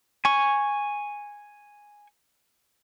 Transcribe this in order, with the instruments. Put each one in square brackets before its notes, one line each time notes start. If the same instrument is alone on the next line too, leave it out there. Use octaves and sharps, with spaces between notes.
[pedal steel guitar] G#5 C#6